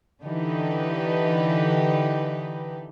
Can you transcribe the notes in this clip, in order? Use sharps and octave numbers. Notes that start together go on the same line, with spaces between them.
D3 E3 D#4 G4 B4